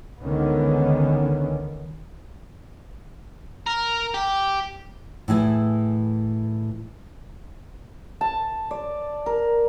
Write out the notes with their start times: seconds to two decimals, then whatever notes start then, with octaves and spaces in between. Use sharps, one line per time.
0.20 C#2 D3 D#3 B3 C#4
3.66 A#4
4.14 G4
5.28 A2 E3 E4 G#4
8.21 A5
8.71 D5
9.26 A#4